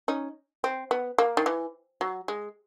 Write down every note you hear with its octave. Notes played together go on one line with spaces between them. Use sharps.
C#4 D#4
C4
B3
A#3
D#3
E3
F#3
G#3